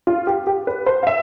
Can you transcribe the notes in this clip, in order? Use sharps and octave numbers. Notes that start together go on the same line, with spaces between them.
F4
G4
G4
B4
C5
F5
E5